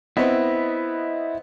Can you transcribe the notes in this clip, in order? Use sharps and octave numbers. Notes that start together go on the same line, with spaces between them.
B3 C4 E4 B4 D#5